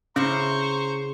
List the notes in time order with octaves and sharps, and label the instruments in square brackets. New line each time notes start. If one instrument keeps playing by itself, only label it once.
[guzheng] C#3 E4 [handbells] C#4 [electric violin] C5 C#6 [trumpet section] A#5 C6